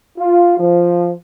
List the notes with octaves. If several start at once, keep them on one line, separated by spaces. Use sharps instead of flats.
F4
F3